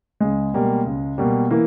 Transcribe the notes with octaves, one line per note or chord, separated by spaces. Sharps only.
C#2 G#3
B2 G3 A#3
C#2
B2 G3 A#3
E3 A#3